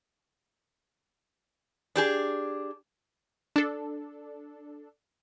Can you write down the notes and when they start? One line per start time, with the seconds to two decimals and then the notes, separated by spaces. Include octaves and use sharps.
1.96 D4 G4 G#4
3.56 D4 A4